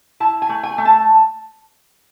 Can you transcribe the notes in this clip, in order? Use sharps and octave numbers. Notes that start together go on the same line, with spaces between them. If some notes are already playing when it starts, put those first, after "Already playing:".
E4 A5
G#5
A3
G#5
A3
A5